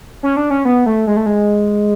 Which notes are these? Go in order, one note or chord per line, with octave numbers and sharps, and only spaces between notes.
C#4
D4
C#4
B3
A3
G#3
A3
G#3